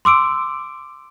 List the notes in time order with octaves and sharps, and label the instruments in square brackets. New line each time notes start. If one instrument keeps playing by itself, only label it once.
[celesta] C6 D6 E6 D7